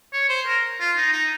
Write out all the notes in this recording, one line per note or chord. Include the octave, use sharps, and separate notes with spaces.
C#5
C5
A#4
F4
D#4
D#4